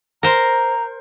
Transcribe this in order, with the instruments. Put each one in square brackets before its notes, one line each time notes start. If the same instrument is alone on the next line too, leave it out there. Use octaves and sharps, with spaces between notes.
[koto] A#4 C5 [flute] A#5